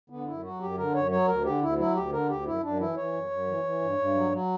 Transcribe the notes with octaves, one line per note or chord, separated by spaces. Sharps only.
D3 B3
F#2 E4
F#3 F#4
F#2 G4
D3 A#4
F#2 C#5
F#3 C#5
D2 A#4
D3 G4
D2 E4
F#3 E4
D2 G4
D3 A#4
D2 G4
F#2 E4
F#2 D4
E3 E4
E3 C#5
F#2
F#2
E3
E3
G2
G2
F#3
F#3